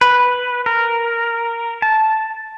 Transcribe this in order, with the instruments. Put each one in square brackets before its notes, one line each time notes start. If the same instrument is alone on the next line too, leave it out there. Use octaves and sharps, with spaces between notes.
[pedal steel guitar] B4
A#4
A5